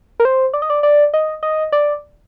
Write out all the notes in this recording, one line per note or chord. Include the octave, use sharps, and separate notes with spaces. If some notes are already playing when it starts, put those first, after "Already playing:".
A#4
C5
D5
D#5
D5
D5
D#5
D#5
D5